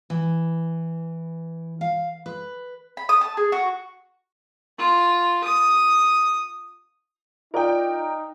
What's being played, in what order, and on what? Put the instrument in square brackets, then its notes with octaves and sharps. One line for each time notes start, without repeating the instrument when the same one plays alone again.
[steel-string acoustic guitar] E3
F5
B4
[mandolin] B5
D#6
A5
G#4
F#4
[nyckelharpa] F4
D#6
[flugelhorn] D#4 [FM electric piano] F4 D5 D#5 [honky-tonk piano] A#4 G5